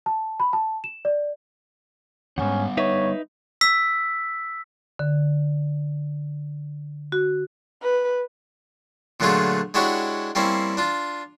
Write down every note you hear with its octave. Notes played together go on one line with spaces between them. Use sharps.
A5
B5
A5
E7
D5
D#2 G#2 G3 B3 C#4 F#5
D#4 B4 C#5 E5
E6 B6
D3
F#4
B4
A#2 D3 F#3 A3 F4 G#4
G#3 D4 E4 F#4 G4 C#5
G3 A#3 C4 C#4 E4
D4 F4